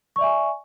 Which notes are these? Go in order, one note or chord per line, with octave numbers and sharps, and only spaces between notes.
D5 E5 G#5 C#6